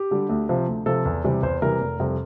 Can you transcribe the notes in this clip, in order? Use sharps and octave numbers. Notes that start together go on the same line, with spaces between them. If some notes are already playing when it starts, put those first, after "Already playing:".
Already playing: G4
D3 G3
D2
C3 F3
D2
C3 F3 A4
E2
C3 E3 G3
E2 C5
C3 E3 G3 A#4
F1
F2 C3 G3